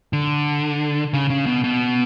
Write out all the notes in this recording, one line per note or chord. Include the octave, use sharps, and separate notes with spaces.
D3
C#3
C#3
B2
B2